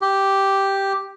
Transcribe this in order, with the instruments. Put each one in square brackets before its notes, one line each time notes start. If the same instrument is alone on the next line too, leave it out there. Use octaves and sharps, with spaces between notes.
[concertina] G4